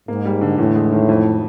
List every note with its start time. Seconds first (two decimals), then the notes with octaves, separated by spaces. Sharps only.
0.08 G#2 A#3
0.25 G3
0.41 D3
0.58 E2 A2
0.75 G#3
0.92 D#3
1.09 F2